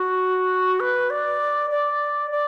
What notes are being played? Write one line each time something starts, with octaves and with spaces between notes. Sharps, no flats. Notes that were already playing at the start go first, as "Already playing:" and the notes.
Already playing: F#4
B4
D5
D5
D5